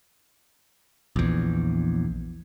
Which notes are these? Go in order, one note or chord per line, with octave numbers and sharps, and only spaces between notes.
A#1 E2